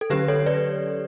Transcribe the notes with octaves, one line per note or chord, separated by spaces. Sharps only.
A4
D3 F#3 C#4 G4 B4
A4 C#5
B4 D5